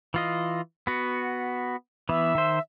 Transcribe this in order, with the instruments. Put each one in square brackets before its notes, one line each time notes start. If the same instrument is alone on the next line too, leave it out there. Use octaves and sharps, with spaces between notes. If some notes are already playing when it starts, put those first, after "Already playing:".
[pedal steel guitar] E3 F4 D#5
B3 F#4
[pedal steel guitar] E3 B3 [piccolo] E5
[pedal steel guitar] D#3 C5